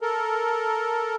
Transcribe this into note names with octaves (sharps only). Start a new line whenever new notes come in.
A4 A#4